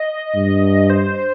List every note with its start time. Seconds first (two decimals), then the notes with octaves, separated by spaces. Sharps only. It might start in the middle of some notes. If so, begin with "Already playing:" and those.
Already playing: D#5
0.35 G2
0.90 C5